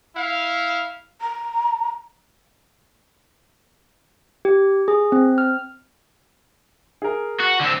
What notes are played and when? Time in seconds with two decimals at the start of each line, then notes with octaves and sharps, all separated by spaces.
0.15 E4 F5
1.21 A#5
4.45 G4
4.88 G#4
5.12 C4
5.38 F6
7.02 G#4 A#4
7.40 F#4
7.61 D3 C4